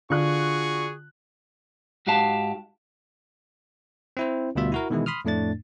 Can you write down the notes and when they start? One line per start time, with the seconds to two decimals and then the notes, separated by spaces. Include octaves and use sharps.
0.10 D3 F4 F#4 G#4 C#6 F#6
2.07 G#2 F#4 G4 F5 A5
4.17 C4 E4 C5
4.55 D2 B2 G3 F4 E5
4.72 E4 F#4 A#4
4.90 B2 D#3 E3 G#3 E4
5.06 B5 C6 D#6 F6
5.25 F2 A2 A3 D4 A6